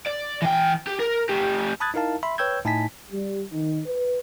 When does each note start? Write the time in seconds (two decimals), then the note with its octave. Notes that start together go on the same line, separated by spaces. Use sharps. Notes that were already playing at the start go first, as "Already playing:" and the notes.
0.06 D5
0.42 E3 G5
0.87 G4
0.99 A#4
1.29 A3 G4
1.80 A5 B5 D#6 F#6 G#6 A6
1.94 D#4 E4 A#4 F5 A5
2.23 E5 B5 C6
2.38 B4 C#5 G5 E6 G6 G#6
2.65 A2 D#4 G#5 A5 B6
3.11 G3
3.53 D#3
3.87 B4